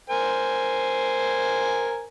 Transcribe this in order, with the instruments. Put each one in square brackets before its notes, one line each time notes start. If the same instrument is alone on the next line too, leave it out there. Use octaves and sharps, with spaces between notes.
[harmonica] A#4 C5 G#5